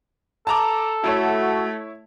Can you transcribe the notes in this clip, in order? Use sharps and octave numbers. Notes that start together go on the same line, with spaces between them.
A4 A5 A#5 D6
A3 E4 F#4 C#5